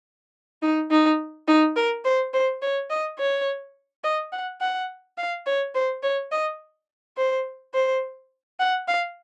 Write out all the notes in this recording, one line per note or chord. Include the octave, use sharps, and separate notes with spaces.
D#4
D#4
D#4
A#4
C5
C5
C#5
D#5
C#5
D#5
F#5
F#5
F5
C#5
C5
C#5
D#5
C5
C5
F#5
F5